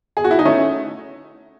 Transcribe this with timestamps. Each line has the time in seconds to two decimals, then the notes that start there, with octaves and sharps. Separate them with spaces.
0.17 G#4
0.24 F#4
0.31 E4
0.39 D#4
0.45 A3 C#4